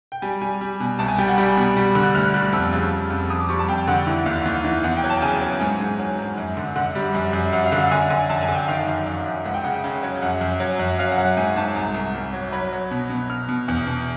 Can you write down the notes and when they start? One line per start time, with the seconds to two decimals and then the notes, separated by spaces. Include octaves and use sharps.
0.12 G5
0.22 G3 G#5
0.42 G3 G#5
0.61 G3
0.80 B2
0.99 C2 A5
1.08 G#5
1.18 G3 G5
1.28 F#5
1.38 G3 B5
1.57 B2
1.77 G3
1.95 D3
2.03 F#6
2.15 D2 F6
2.34 G3 F#6
2.52 F2 E6
2.73 C#3
2.92 F2
3.10 F2
3.30 F2 D#6
3.40 D6
3.49 G3 C#6
3.59 A5
3.68 F2 G5
3.88 D3 F#5
4.07 E3
4.26 D#2
4.46 D#2
4.65 E3
4.83 E2 F#5
4.97 G5
5.03 F#3
5.10 A5
5.22 C#3 G#5
5.41 F#3
5.61 G#2
5.80 G#2
5.99 F#3
6.18 G#2
6.38 F#2
6.57 D3
6.76 D3 F#5
6.95 G3
7.14 F#2
7.33 F#2
7.53 F#2 F#5
7.66 F5
7.72 D3
7.79 F#5
7.92 D3 G#5
8.10 D3 G#5
8.29 F#2 A5
8.43 G#5
8.49 D3
8.55 G5
8.68 D#3 F5
8.87 F#2
9.06 F#2
9.26 F#2
9.45 C#2 F#5
9.54 G5
9.64 C#3 F#5
9.84 C#3
10.03 F#3
10.22 F#2 F#5
10.41 F#2
10.60 F#3
10.79 F#2
10.99 F#3 F5
11.12 F#5
11.18 F#3
11.25 F#5
11.37 G#2 G#5
11.56 G#2 A5
11.76 C2 A#5
11.94 C2
12.14 C2
12.33 F#3
12.52 F#3 B5
12.73 F#3
12.91 B2
13.10 B2
13.30 B2 F6
13.49 B2
13.68 E2
13.87 B2